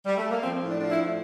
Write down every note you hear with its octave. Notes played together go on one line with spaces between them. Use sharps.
G3
A3
A#3
F3 C4
A2
D4
F3 D4
E4
A2